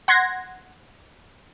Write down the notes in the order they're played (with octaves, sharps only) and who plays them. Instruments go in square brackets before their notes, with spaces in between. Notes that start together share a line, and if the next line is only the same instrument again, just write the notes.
[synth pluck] F#5 C6 G#6 A#6 C7